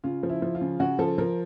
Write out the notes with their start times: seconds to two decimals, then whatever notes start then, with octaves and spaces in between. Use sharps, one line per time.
0.04 C#3 F4
0.23 F3
0.29 E4
0.42 F3
0.55 F4
0.61 C#3
0.80 C#3 F#4
0.99 F3 A4
1.18 F3 A#4